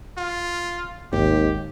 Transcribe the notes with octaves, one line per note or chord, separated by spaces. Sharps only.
F4
G#1 D#2 G#2 G4